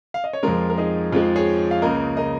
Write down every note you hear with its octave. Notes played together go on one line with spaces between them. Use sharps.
F5
D#5
C#5
F2 F3 G#3 F4 A#4
A#4
D#4 G#4
F2 F3 G#3 F4
G#4 C#5
F5
C#2 C#3 A#3 A#4 D#5
A#4 D#5